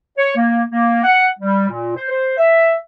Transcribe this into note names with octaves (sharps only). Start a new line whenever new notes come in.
C#5
A#3
A#3
F#5
G3
A#2
C5
C5
E5